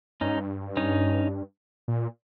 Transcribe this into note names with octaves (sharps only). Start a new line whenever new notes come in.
G2 C#4 D#4
G#2
G2
C#4 D#4
A#2